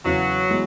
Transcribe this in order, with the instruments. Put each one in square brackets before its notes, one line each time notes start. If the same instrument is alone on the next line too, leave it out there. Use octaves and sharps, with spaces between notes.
[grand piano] E2 C#3 E3 [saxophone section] F#3
[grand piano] E3 G#3 B3 F#4